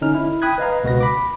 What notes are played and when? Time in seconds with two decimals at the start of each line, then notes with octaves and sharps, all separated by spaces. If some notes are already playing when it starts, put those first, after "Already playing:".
0.01 D3 C#4 D#4 F6
0.15 E4
0.42 G5 B5 D#6 F#6 G#6
0.58 B4 D#5 F5 A#5
0.84 C#2 B2 F#4 B4 A#6
1.00 B5 D6